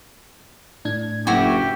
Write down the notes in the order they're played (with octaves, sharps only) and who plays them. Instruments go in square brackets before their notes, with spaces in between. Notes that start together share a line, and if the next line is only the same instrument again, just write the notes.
[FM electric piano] A2 D4 G#6
[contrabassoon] F#1 [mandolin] E4 F#4 [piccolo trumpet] G4